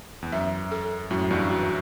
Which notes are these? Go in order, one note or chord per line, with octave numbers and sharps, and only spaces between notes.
E2
F#2 E5
A4
F#2 A2 F#4
E2 G2
F#4